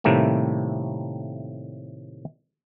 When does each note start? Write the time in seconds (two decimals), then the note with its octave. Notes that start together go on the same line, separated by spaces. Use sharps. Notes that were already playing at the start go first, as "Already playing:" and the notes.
0.04 A2 C3 D#3 G3 A3 A#3